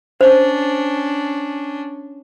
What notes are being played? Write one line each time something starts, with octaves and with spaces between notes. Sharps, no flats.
C#4 D4 C5